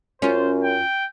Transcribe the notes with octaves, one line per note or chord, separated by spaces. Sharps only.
F#2 C#4 F4 C5
G5